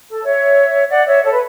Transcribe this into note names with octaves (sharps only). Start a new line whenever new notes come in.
A4
C#5 E5
D5 F#5
C#5 E5
A4 C#5
B4